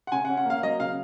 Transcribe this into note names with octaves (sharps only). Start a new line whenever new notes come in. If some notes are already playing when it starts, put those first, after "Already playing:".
F#5
C#3 G#5
F#5
C#4
F#5
A#3 F5
F#3 D#5
C#3 F5